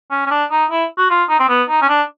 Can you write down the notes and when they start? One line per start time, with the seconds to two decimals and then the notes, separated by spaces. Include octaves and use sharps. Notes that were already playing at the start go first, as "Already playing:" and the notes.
0.11 C#4
0.26 C#4
0.31 D4
0.51 D#4
0.71 E4
0.98 F#4
1.10 F4
1.29 D#4
1.39 C4
1.49 B3
1.69 D#4
1.82 C#4
1.89 D4